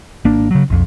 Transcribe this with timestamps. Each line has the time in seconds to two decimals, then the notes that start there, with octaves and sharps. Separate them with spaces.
0.25 G#1 A#3 D4
0.51 C#3 F#3
0.70 B1 F2